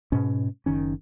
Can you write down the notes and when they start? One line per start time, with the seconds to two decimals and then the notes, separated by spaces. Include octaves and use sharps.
0.12 G#2 B2 C#4
0.66 F#1 D#3 C#4